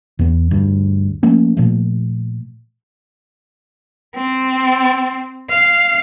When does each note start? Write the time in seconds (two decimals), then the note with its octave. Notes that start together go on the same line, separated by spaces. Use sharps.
0.19 E2 B3
0.51 D2 G2
1.23 F3 A3 A#3 C#4
1.57 A#2 F3 A3
4.16 C4
5.50 F5